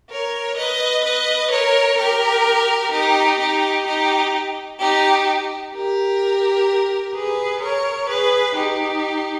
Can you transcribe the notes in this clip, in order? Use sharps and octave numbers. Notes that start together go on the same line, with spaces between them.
A#4 C#5
B4 D#5
B4 D#5
A#4 C#5
G4 A#4
D#4 G4
D#4 G4
D#4 G4
D#4 G4
G4 A#4
G#4 B4
A#4 C#5
G#4 B4
D#4 G4